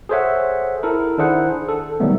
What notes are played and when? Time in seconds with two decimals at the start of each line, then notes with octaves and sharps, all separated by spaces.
0.09 G#4 A4 C5 C#5 E5 F#5
0.83 E4 A4 A#4
1.18 D#3 D4 E4 G#4 C5 F#5
1.68 A4
2.00 B2 D#3 F#3 G3 A3 B3